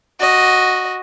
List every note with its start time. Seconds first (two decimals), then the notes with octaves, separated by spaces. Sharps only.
0.20 F#4 D#5